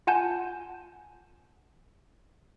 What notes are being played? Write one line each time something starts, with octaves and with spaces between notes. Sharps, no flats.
F4 F#5 G#5 A5 G6